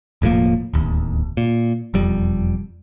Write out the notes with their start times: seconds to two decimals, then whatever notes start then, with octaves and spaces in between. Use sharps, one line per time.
0.22 E1 A2 F3 A#3
0.73 D1 D#2
1.37 A#2
1.94 E1 F2 G3